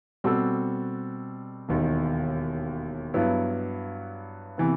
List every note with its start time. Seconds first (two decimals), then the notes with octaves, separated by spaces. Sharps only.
0.24 B2 G3 C4 F#4 A4
1.69 E1 D#2 D#3
3.14 G2 F#3 B3 E4
4.58 C3 E3 B3